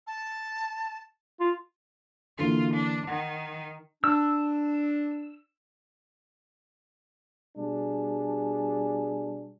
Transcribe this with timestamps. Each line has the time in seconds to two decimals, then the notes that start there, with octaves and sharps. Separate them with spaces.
0.07 A5
1.40 F4
2.39 D3 E3 A#3 F4
2.75 D4
3.08 D#3 F#5
4.04 D4 E6
7.57 B2 G3 D4 G#4